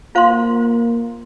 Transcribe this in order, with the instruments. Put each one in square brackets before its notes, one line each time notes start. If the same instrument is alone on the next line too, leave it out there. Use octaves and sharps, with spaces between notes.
[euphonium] A#3 [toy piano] F4 C5 F5 C6